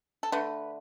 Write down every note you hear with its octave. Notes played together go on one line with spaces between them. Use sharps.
A4
D3 A3 B4